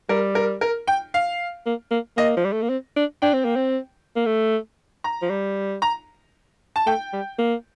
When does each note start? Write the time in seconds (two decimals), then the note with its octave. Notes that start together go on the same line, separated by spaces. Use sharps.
0.09 G3 A#4
0.35 A#4
0.61 A#4
0.87 G5
1.14 F5
1.66 A#3
1.91 A#3
2.17 A#3 D#5
2.37 F3
2.45 G3
2.53 A3
2.62 A#3
2.69 C4
2.97 D4
3.22 D4 G5
3.33 C4
3.45 A#3
3.56 C4
4.16 A#3
4.26 A3
5.04 A#5
5.22 F3
5.30 G3
5.82 A#5
6.76 A5
6.86 A3 G5
7.13 G3
7.39 A#3